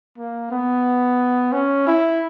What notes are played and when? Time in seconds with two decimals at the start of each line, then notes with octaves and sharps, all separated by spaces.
0.18 A#3
0.51 B3
1.52 C#4
1.87 E4